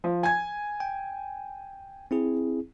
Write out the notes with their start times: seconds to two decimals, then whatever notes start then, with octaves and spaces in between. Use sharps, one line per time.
0.04 F3
0.23 G#5 G#6
0.80 G5
2.11 C4 E4 G#4